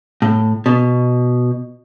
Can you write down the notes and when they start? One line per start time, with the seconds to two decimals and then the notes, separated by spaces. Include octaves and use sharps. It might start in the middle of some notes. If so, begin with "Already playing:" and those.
0.22 A2
0.66 B2